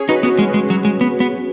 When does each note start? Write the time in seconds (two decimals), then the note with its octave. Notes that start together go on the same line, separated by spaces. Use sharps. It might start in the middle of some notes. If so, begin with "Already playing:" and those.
Already playing: C#4 G#4 C#5
0.09 D#4 F#4 B4
0.23 B3 C#4 F#4
0.39 G#3 C#4
0.54 G#3
0.70 F#3
0.85 G#3
1.01 B3
1.20 B3